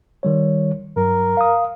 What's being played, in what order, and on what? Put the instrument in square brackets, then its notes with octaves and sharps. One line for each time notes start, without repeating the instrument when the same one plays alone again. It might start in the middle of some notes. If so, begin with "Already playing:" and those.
[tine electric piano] D#3 G3 C#5
[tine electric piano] G2 F#3 [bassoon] A#4
[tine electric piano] F5 D#6